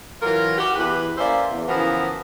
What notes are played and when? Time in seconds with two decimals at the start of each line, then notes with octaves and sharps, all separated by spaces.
0.22 E3 F#3 F4 A#4
0.58 F#4 G4
0.75 E2 G4 B4
1.18 A#3 C#4 C5 D5 E5
1.50 E2
1.68 C#3 E3 F3 B3 F#4 A#4